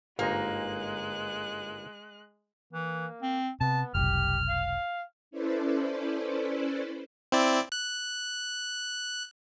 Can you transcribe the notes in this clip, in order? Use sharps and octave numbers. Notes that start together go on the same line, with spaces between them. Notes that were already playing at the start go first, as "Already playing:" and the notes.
G1 G#2 G#3 A#3 D#4 F#6
E3 A#3
C4
C3 B3 A5
F1 B1 G4 F6
F5
C#4 E4 A4 B4 C5 D5
C4 E4 D5
F#6